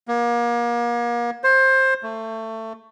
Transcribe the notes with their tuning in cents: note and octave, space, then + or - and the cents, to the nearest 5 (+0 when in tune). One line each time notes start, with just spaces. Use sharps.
A#3 +35
C5 +20
A3 +20